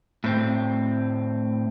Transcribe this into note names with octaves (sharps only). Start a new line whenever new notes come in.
A2 C4